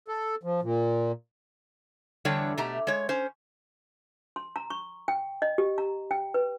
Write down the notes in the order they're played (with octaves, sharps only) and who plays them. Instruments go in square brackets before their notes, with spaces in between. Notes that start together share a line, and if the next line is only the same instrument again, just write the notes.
[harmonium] A4
F3
A#2
[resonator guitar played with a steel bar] E2 D3 G3 D4 C#5 G5
B2 A3 G4 A#5
G#3 C#5
C#4 C5
[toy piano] C6
A#5
C#6
G5
D#5
G4
A#5
G5
B4